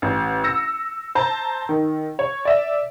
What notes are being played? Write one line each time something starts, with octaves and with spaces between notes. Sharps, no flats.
A1
E6 A#6 C#7
C5 A5 A#5
D#3
C#5
D5 E5